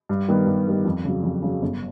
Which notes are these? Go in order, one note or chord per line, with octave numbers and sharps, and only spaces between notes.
G2
D#3 G3 B3
G2
D#3 G3 B3
F2
C#3 F#3
F2
C#3 F#3
G1